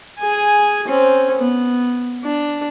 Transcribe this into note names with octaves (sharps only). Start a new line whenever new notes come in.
G#4 G#5
C4 C#4
B3
D4